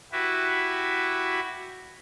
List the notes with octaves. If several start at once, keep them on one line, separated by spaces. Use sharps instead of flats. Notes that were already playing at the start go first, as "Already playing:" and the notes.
E4 F#4 G4 B4